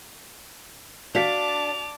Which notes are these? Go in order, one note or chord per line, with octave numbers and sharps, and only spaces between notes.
D4 F#4 F5 A5 D6 B6 F7